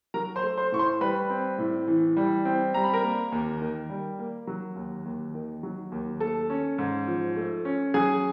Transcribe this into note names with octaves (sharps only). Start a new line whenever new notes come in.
F#3 A#4 A#5
C5 C6
A3
C5 C6
A2 C#6
C5 C6
G3 B4 B5
C4
A2
E3
G3
C4
G3 A#5
B5
A#4 A#5
A#3
D#2
D#3
G3
A#3
F#3
D#2
D#2
D#3
F#3
D#2
A3 A4 A5
C#4
G#2
F3
A3
C#4
F#3 G#4 G#5